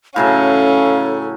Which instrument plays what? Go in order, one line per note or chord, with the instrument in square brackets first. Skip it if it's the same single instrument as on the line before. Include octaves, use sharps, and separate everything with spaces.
[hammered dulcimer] A2 C#3 F#3 [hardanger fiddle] C#4 [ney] A4 [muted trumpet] F5